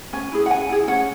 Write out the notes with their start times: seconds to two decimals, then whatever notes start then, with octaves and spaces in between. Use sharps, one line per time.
0.13 C#4 G#5
0.32 E4 G#4
0.46 F#5
0.50 C#4 G#5
0.69 E4 G#4
0.88 C#4 F#5